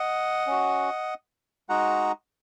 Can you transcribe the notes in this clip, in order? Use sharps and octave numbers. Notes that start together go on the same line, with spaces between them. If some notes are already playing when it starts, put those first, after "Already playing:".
Already playing: D#5 F#5
C#4 F#4
G#3 D#4 F#4 F#5 A#5